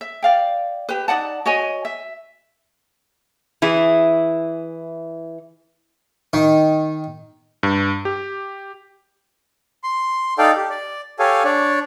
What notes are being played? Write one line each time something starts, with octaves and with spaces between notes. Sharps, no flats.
E5
D5 F5 G5
G4 B4
D#4 D5 F#5 A5
F#4 C#5 D#5 G#5
E5
E3 E4 G#4
D#3
G2
G4
C6
D#4 A4 D5 F5 G5
G4
D5
G4 A4 C#5 F5 G#5
D4 C#5 D5